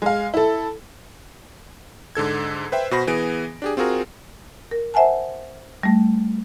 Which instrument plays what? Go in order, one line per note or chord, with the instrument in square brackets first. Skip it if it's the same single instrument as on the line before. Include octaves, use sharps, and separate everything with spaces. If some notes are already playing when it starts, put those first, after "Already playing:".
[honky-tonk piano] G#3 F5
E4 A4
[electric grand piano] G#2 D3 A4 G#6
B4 C5 E5 G5
B2 F#4 C5 B5 A#6
E3 B3 G#4 D7
D4 G4 G#4
C4 F4 F#4 G#4 A#4
[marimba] A#4
C5 E5 F#5 G#5 A5
G3 A3